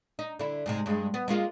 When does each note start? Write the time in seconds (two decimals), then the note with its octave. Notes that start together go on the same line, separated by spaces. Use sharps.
0.19 D#4
0.39 D3 E4
0.66 G#2 C3 G#3
0.86 G2 G#3
1.14 B3
1.28 G#3 A#3 F4